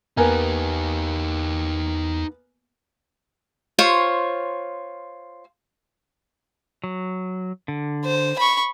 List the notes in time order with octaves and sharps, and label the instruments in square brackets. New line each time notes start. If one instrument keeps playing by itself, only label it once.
[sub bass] E2 [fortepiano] A#3 B3 G#5 [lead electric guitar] D#4 G4
[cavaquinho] F4 C5 C#5 C#6
[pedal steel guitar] F#3
D3
[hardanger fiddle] C5
B5 C#6